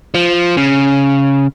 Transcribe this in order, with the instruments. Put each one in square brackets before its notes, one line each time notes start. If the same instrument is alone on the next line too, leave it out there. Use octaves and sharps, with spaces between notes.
[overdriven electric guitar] F3
C#3